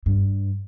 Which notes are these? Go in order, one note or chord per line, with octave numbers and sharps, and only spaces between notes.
G2